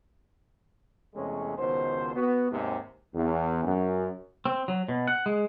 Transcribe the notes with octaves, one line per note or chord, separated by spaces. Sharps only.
E2 C3 E3 G#3 A3 C#4
C#2 B2 D#3 C5
B3 F#4
D#2 G#2 C3
E2
F#2
C4
F#3
B2
F#5
G#3